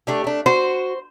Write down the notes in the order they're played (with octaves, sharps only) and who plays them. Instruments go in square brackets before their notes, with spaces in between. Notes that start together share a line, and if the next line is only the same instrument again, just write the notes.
[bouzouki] A3 D4 G4
A3 D4
[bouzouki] F#4 [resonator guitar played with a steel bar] C5